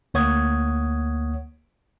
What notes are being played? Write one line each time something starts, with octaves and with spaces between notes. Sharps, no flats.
D2 A#3 C#5 F#5 D#6 G#6